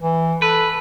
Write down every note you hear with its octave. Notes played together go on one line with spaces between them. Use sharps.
E3
A4 B4